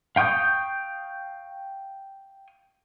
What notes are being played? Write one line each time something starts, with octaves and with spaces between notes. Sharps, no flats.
F5 G5 C#6 D#6 G6